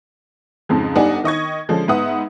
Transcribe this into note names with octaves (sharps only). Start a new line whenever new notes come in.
F2 G#2 C#3 F3
G1 G3 D4 D#4 F#5 G#5
D#3 D#5 C#6 G#6
D3 F3 G#3 C#4
G#2 B3 B4 E5 F#5 D#6